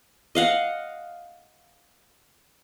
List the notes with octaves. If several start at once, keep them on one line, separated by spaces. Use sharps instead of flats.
D#5 F5 F#5